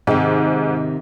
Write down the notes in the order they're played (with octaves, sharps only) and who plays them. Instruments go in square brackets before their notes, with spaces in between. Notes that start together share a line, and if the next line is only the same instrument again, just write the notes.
[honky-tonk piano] G#2 [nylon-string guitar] C3 D#3